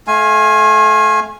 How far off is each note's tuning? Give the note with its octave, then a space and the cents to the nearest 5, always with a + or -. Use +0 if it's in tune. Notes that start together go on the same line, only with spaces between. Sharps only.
A3 -30 F5 +0 G#5 +0